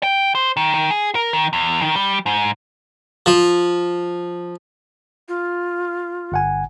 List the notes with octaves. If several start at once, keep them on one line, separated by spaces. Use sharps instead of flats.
G5
C5
D#3
D#3
G#4
A#4
D#3
E2
D#3
G3
G#2
F3
F4
G1 F#5 G#5